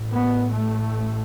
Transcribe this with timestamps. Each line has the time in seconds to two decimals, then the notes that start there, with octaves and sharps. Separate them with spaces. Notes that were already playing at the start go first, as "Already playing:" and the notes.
Already playing: A1 A2
0.12 B3
0.53 A3